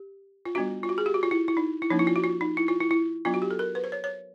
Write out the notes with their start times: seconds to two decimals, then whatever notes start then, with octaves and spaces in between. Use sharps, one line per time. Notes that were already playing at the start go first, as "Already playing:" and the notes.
Already playing: G4
0.45 F4
0.55 G3 B3 D4 F#4
0.83 F4
0.89 F#4
0.98 G#4
1.06 G4
1.14 F#4
1.23 F4
1.31 E4
1.48 E4
1.57 D#4
1.82 E4
1.90 F3 A#3 C#4 D#4
1.99 E4
2.07 F4
2.16 F#4
2.24 F4
2.41 D#4
2.57 E4
2.68 F4
2.80 E4
2.91 E4
3.25 F#3 B3 D4 F4
3.34 F#4
3.42 G4
3.51 A4
3.59 A#4
3.75 B4
3.84 C5
3.92 C#5
4.04 C#5